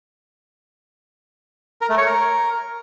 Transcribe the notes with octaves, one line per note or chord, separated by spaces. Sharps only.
A#4
A3
C#5
A#4